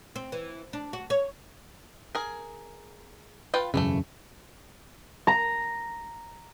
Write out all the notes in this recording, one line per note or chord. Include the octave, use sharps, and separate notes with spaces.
C4
E3
D4
F#4
C#5
G#4 A#4
F4 B4 G5
E1 F#2 C#3 E3 G3 A3
A#5